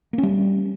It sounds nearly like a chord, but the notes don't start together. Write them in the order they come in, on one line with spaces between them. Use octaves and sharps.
A#3 C#4 G3